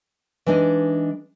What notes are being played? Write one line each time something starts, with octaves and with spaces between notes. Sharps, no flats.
E3 G#3 D4 D#4 D#5